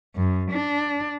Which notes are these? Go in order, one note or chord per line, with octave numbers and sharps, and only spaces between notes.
F#2
D4